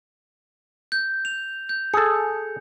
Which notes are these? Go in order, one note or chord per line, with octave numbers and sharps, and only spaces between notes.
G6
F7
G6
G#4 A4 C#7